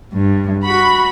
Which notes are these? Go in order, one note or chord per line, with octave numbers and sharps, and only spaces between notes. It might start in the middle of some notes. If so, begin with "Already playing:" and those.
G2
F#4 B5